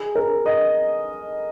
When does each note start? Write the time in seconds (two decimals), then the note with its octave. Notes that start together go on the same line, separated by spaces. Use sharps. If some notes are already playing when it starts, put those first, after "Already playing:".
Already playing: G#4
0.15 A#4
0.46 D#5